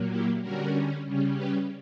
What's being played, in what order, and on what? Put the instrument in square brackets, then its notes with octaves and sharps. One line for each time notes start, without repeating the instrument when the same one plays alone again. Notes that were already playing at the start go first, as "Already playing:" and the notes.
Already playing: [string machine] A#2 F#3 A#3
E4 G4
D3 G3 C#4 F#4 A#4
C#3 G3 C#4
G4 B4